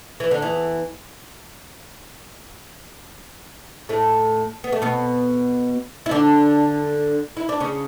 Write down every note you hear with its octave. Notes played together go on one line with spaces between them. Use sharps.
E3
D3
E2 E3
A2 A3
B3
A3
B2 B3
E4
D3 D4
E4
D4
C#3 C#4